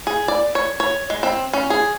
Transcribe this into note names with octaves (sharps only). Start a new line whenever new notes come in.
G#4
D5
C#5
C#5
G#3
C4
C#4
G#4